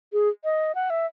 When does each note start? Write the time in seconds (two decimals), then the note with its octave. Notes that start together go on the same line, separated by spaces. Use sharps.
0.13 G#4
0.44 D#5
0.75 F#5
0.90 E5